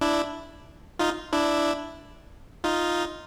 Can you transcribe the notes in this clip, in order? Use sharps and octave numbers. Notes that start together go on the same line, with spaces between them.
D4 E4
D#4 F4
D4 E4
D#4 F4